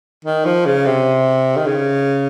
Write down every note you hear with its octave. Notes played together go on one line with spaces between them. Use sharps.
D#3
F3
C#3
C3
D#3
C#3